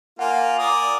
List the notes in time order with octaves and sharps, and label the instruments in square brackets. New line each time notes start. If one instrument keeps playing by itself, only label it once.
[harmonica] A#3 F4 [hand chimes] F#5 G#5
[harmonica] A#4 D5 D#6